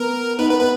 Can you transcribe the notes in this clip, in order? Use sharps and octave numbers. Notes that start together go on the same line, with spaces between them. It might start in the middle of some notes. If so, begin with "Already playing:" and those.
Already playing: B3 A#4
B3 D#4 B4
B3 B4
B3 B4